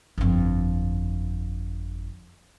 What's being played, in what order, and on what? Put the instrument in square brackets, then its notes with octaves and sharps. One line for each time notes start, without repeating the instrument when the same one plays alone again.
[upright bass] G1 F2